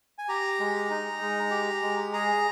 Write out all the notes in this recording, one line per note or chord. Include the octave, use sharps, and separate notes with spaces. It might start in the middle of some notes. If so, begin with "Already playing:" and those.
G#5
G4 A#5
G#3
D#4
G#3
G4
G#3
G#4 A#5